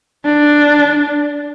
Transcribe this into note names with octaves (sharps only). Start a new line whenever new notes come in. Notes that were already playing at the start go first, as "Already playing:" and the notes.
D4